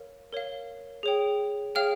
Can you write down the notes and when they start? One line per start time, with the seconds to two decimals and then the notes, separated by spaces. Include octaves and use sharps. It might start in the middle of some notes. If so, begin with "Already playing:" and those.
Already playing: A#4 C#5 F5
0.33 A#4 C#5 F5
1.03 G#4 C#5 G5
1.75 G#4 C#5 F5 G5 F6